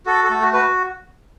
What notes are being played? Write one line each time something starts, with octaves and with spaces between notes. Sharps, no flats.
F#4 A4
A4
A3
F#4
F#4 B4